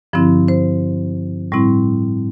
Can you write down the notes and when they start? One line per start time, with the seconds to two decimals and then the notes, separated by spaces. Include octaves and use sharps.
0.13 G2 D3 F3 C4 E4
0.48 C5
1.52 A2 G3 C4 E4